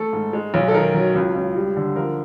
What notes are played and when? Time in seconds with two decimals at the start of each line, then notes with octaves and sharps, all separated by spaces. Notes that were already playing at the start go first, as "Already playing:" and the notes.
Already playing: A3 A4
0.13 G#2
0.33 G#3
0.54 B1
0.68 A4
0.74 D#3 A#4
0.94 F#3
1.15 C#2
1.35 C#2
1.55 G3
1.76 D3
1.96 F3 A#4